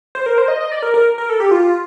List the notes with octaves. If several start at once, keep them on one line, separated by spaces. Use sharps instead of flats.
C5
A#4
C5
D#5
D#5
D5
A#4
A#4
A#4
A4
G4
F4